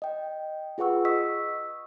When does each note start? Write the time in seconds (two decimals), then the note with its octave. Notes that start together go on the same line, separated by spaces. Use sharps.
0.02 D#5 G5
0.78 F4 G#4 B4 F#5 C#6 E6
1.05 D#5 C#6 D#6 E6 B6